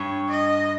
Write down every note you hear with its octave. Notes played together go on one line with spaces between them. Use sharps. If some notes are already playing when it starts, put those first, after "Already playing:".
Already playing: G2 C#5
D#5